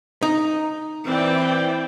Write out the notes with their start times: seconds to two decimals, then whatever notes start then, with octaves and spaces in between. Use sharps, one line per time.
0.22 D#4
1.05 E3 C4 D5 G5